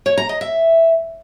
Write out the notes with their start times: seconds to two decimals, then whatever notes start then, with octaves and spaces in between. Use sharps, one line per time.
0.06 C#5
0.18 A#5
0.29 D#5
0.41 E5